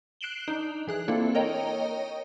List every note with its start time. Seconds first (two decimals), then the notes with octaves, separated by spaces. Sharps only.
0.21 F#6 C7 D7 E7 F#7 G7
0.48 D4 D#4
0.87 E3 G#4 F#6
1.08 A#3 C4 D4 E4 F4 A4
1.35 A#4 C#5 D#5 G5 A#5